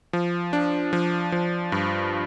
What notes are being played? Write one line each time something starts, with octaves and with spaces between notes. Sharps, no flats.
F3
D4
F3
F3
G2